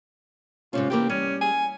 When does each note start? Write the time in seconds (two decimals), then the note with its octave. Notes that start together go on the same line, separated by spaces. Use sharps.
0.73 G#2 C3 C#4 F4
0.90 C3 E3 A#3 G4
1.10 G3 C#4
1.41 G#5